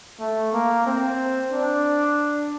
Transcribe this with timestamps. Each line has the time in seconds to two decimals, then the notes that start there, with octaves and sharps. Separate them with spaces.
0.20 A3
0.53 A#3
0.86 C4
1.53 D4